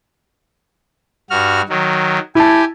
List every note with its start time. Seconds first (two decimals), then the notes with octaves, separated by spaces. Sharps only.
1.30 G2 F#4 F6
1.69 D#3 F#3
2.35 E4 G4 G#5 A5